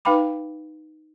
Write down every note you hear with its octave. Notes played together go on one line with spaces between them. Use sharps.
D#4 B4 F5 G5 B5 D6